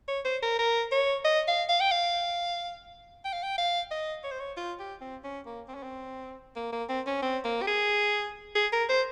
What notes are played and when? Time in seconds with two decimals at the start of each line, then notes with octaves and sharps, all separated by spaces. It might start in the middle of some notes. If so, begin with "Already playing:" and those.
0.08 C#5
0.25 C5
0.43 A#4
0.59 A#4
0.92 C#5
1.25 D#5
1.48 F5
1.69 F5
1.81 G5
1.92 F5
3.25 G5
3.33 F5
3.43 G5
3.58 F5
3.91 D#5
4.24 C#5
4.31 C5
4.40 C#5
4.57 F4
4.79 G4
5.01 C4
5.24 C#4
5.46 A#3
5.68 C4
5.75 C#4
5.83 C4
6.56 A#3
6.72 A#3
6.89 C4
7.07 C#4
7.22 C4
7.45 A#3
7.62 G4
7.67 G#4
8.55 G#4
8.73 A#4
8.89 C5